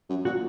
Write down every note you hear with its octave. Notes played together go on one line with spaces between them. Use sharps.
F#2
A#2 F#4